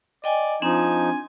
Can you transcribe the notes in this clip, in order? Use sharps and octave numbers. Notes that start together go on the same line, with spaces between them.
D5 D#5 G5 G#5
F3 C4 D4 D#4 G#5